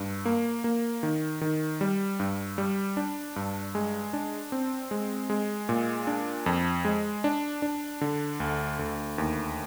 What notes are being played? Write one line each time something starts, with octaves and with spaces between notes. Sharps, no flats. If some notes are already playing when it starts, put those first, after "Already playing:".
Already playing: G2
A#3
A#3
D#3
D#3
G3
G2
G3
D4
G2
G#3
D4
C4
G#3
G#3
A#2
D4
F2
G#3
D4
D4
D3
D2
D2
D#2